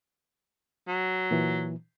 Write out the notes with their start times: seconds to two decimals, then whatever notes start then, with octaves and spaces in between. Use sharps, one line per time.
0.88 F#3
1.31 A#2 E3